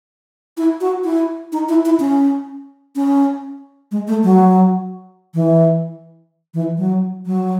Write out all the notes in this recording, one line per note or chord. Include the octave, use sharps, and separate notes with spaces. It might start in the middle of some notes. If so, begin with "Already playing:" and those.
E4
F#4
E4
D#4
E4
E4
C#4
C#4
G#3
A3
F#3
E3
E3
F#3
F#3